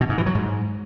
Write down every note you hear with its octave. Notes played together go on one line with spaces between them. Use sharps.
B2
G#2
E3
F#3
G#2